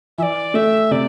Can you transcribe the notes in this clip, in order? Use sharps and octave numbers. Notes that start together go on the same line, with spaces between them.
E3 D5 E5
A3 E5
C3 D5